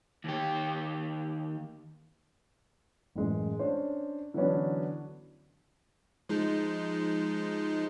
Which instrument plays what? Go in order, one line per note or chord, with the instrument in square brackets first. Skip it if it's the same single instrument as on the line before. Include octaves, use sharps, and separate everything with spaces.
[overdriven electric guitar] D#2 G4
[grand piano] A1 F#2 G#3
C#4 D4 C5
D3 E3 F#3 B3 C#4 D4
[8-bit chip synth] F3 G#3 D#4